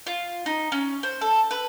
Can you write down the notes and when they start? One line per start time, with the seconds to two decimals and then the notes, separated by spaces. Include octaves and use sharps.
0.07 F4
0.46 D#4
0.72 C#4
1.03 C5
1.21 A4
1.51 B4